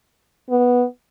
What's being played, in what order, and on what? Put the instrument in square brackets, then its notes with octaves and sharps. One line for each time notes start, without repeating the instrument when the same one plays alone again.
[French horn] B3